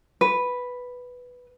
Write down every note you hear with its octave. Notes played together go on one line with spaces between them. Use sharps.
B4